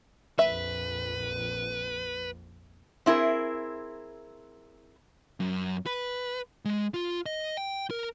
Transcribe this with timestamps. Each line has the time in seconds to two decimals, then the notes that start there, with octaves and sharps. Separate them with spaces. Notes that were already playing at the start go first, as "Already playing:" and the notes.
0.39 A#1 F2 B4 E5
3.06 C4 E4 G#4 A#4
5.40 F#2
5.86 B4
6.65 G#3
6.94 F4
7.26 D#5
7.57 G5
7.90 A#4